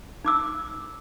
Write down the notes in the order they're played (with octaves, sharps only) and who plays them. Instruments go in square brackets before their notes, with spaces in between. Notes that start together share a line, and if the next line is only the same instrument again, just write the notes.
[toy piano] D#4 D6 E6